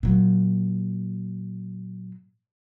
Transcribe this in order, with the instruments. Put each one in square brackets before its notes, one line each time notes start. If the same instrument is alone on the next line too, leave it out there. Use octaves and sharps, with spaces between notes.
[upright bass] A#2 F#3